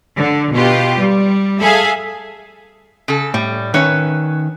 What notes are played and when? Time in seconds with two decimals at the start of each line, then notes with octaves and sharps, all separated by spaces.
0.17 D3
0.53 B2 F4 G4
0.99 G3
1.59 G#4 A4 E5 F5 G#5
3.08 C#3 A4
3.34 A2 G3
3.74 D#3 C#4 B4 C#5 E5